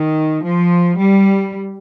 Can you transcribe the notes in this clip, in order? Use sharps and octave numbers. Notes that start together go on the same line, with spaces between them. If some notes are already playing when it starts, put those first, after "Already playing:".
Already playing: D#3
F3
G3